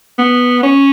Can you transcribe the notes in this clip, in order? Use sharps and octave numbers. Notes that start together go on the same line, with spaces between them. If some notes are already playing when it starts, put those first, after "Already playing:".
B3
C#4